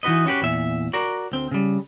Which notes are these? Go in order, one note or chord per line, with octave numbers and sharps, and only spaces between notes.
E3 D#4 F#4 B4 D#5
C#4 F#4 G4 B4
E2 A#2 E5
F#4 A#4 D5 A#5
D2 C4
C#3 G3